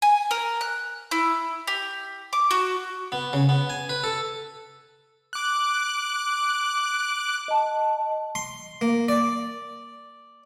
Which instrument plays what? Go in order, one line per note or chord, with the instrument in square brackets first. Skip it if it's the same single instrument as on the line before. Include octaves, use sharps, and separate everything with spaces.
[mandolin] G#5
A#4
F#6
E4
G4
D6
F#4
[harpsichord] B3
C#3
B3
G#5
B4
A4
[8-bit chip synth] D6 F#6
[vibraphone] D#5 A5
[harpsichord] C6
A#3
D5